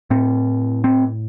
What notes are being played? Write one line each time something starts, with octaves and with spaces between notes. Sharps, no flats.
A2 C4
C4